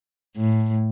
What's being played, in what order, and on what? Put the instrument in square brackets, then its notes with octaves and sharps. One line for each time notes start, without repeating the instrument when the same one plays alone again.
[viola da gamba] A2